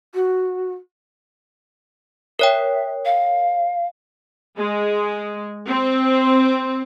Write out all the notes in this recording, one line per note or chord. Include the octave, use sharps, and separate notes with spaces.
F#4
A#4 C#5 E5 G5
F5
G#3
C4